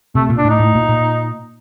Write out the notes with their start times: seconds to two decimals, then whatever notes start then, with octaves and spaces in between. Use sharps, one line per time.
0.15 C3 A3
0.30 A#2
0.38 D4
0.45 A2 D#4
0.60 A2
0.75 A#2
0.89 A#2